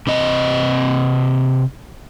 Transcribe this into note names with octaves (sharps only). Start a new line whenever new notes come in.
C3 C4 D#5